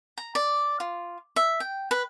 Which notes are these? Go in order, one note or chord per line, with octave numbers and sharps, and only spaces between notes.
A#5
D5
F4
E5
G5
B4